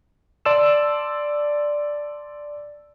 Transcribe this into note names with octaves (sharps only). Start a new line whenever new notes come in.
D5 A5 C6 E6 E7